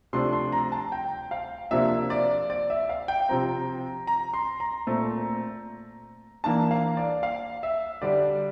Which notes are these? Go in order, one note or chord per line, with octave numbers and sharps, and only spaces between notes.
C3 F3 A3 D4 C6
C6
A#5
A5
G5
F5
C3 F3 A#3 D4 E5
D5
D5
E5
F5
G5
C3 F3 C4 A#5
A#5
C6
A#5
A#2 A3 C4
E3 A#3 D4 A5
F5
D5
F5
E5
D3 G3 D4 D5